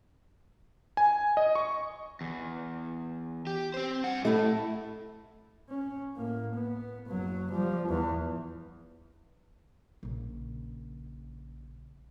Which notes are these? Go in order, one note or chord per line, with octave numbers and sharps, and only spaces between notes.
G#5
D#5
C#6
E2
G4
C4 C5
G2 F#5
A2 A3 E4
C#4
A2 A#3
B3
F#1 F#3
F3 G3
E2
A#1 C#3